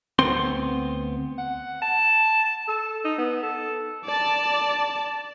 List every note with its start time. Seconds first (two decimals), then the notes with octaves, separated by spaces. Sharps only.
0.19 D2 B3 C4 C6
1.38 F#5
1.82 A5
2.68 A4
3.04 D#4
3.18 B3
3.43 A4
4.05 D5 A5